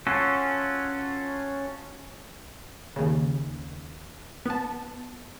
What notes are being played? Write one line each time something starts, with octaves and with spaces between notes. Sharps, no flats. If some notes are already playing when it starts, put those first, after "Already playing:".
C#4 F4 F#4 A4
D#2 C#3
B3 A5